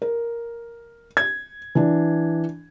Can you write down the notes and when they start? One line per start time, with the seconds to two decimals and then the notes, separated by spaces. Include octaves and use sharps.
0.02 A#4
1.17 G#6
1.75 E3 D4